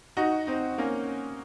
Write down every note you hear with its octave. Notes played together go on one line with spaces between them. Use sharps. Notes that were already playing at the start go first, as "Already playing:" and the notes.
D#4 F#4
C4 D#4
A#3 C#4